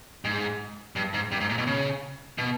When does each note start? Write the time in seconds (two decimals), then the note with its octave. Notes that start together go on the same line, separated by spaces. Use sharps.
0.25 G#2
0.96 G2
1.14 G#2
1.32 G2
1.41 G#2
1.49 A#2
1.58 B2
1.67 C#3
2.38 B2